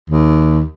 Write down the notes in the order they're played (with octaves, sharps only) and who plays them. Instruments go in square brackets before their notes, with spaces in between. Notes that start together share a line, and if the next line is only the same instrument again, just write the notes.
[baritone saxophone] D#2